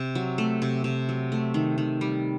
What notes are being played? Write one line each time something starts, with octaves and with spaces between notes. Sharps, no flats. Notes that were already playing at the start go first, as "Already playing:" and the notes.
Already playing: C3
F#3
A3
C3
C3
F#3
A3
D#3
D#3
G3